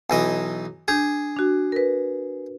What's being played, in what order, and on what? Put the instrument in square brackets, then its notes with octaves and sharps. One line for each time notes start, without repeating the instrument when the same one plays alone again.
[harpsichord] B1 E3 D#5
[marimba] D4 G6 [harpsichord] G#4
[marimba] D4 F#4
A#4 B4